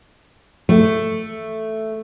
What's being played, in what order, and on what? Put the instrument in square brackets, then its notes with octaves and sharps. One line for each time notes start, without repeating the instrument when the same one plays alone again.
[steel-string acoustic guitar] A3